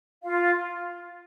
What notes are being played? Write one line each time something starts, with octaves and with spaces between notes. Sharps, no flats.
F4 F5